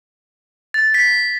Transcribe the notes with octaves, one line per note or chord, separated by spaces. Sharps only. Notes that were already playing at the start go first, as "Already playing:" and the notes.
A6
B6